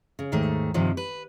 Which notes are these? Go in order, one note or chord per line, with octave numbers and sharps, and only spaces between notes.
C#3
D#2 G#2 D#3 A3
G2 C3 D#3 F3
B4